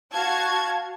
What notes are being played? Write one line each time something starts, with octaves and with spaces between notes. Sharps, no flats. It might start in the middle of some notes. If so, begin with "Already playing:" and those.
F#4 F5 A5 G#6